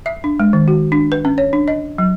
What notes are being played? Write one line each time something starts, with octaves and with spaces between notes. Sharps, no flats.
E5
D4
G#3
D#3
F#4
D4
B4
C#4
C#5
D4
D#5
F#3